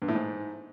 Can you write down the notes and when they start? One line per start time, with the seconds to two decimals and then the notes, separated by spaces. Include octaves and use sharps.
0.02 G2
0.08 A2
0.15 G#2